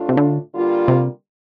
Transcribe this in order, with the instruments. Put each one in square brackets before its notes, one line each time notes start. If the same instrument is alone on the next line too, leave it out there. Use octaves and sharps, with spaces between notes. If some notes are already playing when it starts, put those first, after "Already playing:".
Already playing: [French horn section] A2 A3 D4 F4
[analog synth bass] C3
D3
[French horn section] D3 G3 A#3 F4
[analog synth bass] C3